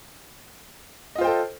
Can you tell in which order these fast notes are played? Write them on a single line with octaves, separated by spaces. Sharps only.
D#5 F4 C5 G5 A4